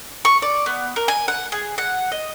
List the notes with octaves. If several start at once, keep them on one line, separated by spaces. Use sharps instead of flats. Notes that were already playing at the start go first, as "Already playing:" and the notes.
C#6
D5
B3
A#4
G#5
F#5
G#4
F#5
D#5